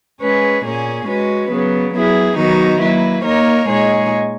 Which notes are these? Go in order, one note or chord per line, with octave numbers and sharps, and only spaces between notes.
G#3 C#4 G#4 B4
A#2 A#3 C#4 G#4
G#3 C#4 F#4 B4
C#3 F#3 B3
F#3 B3 E4 G#4
D#3 F#3 B3 D#4 F#4
F#3 A#3 E4 B4
A#3 D#4 A#4 C#5
A#2 G#3 D#4 G#4 C#5